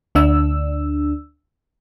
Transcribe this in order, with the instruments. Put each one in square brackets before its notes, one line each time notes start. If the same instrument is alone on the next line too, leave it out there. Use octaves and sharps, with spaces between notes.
[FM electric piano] D2 D4 E6